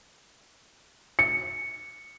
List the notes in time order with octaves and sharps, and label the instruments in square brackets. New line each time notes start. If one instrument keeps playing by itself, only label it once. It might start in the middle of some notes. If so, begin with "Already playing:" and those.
[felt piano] C#7